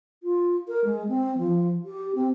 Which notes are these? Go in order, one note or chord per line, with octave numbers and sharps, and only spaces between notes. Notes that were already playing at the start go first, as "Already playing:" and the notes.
F4
A#4
G#3
C4
F3
G4
C4